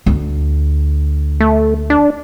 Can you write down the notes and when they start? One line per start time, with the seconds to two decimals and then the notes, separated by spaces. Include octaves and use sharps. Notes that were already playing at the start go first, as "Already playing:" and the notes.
0.06 D2
1.40 A3
1.90 D4